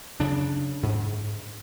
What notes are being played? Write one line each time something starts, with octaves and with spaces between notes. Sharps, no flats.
F#2 C#3 D4
G#2